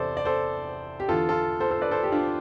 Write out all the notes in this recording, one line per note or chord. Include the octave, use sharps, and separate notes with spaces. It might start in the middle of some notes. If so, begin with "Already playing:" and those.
Already playing: E2 C3 E3 A4 C5 D5
D5
A4 C5
G4
E2 D3 F4 A4
F4 A4
A4 C5
A4 C5
B4 D5
A4 C5
G4
D4 F4